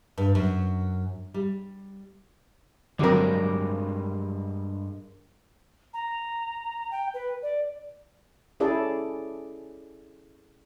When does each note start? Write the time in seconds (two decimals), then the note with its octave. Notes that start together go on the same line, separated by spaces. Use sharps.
0.18 G2
0.35 F#2
1.34 G3
2.99 G2 D3 F#3 G#3 C4 A#4 D5
5.93 A#5
6.91 G5
7.13 B4
7.42 D5
8.60 C#4 E4 G#4 A4 D5